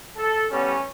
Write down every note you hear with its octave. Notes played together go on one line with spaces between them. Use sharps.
A4
A2 G3 B3 C#4